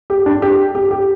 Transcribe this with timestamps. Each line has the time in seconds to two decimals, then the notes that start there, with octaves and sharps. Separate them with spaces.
0.10 G4
0.26 D4
0.42 G4
0.75 G4
0.91 G4